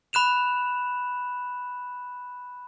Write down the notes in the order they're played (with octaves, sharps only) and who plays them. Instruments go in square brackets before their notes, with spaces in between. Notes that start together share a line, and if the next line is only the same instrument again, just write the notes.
[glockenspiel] B5 F#6 E7 F7